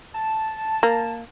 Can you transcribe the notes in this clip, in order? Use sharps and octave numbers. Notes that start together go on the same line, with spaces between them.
A5
A#3